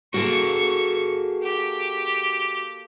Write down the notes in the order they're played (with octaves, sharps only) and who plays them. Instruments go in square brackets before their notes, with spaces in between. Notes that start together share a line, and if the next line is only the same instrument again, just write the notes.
[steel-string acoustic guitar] A#3 A4 [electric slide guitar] F#4 G#4 [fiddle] C#6
[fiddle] G4